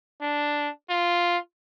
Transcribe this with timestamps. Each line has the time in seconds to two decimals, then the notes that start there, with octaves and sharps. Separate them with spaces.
0.21 D4
0.90 F4